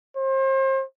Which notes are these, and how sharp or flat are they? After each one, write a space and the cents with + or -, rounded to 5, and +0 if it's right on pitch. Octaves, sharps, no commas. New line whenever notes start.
C5 +35